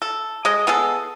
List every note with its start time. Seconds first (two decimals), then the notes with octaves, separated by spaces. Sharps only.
0.02 A4
0.45 G#3 D#5
0.67 B3 G#4 A4